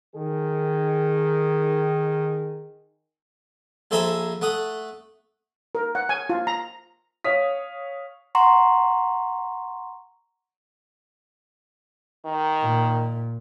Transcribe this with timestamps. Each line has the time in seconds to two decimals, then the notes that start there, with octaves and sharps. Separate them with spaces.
0.16 D#3 G#4
3.91 A#1 A4 C5 E5 G#5 A#5
4.41 A3 F#5 D#6
5.75 A#4
5.95 F#5
6.09 G#5
6.30 F4
6.47 A#5
7.24 C#5 F5 D#6 B6
8.35 F#5 A#5 C6 C#6
12.25 D#3
12.61 A#2